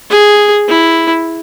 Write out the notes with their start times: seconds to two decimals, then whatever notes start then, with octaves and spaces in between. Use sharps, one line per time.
0.10 G#4
0.68 E4